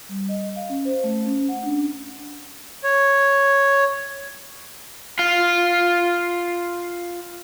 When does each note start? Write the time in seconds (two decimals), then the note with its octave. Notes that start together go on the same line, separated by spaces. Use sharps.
0.09 G3
0.29 D#5
0.56 F5
0.70 C#4
0.85 C5
1.04 A3
1.26 C#4
1.49 F#5
1.63 D4
2.84 C#5
5.19 F4 F5